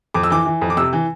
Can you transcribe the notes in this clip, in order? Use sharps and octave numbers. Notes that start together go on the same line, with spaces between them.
F2 D6
E6
E3 D6
E3
F2
D6
C3 E6
E3